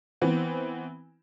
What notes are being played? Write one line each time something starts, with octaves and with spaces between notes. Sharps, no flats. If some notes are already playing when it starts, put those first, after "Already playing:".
E3 B3 C4